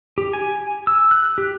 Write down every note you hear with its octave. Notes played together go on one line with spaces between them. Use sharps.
G4
G#5
E6
F#6
G4